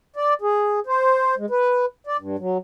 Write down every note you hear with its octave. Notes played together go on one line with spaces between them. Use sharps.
D5
G#4
C5
G#3
B4
D5
G2
F#3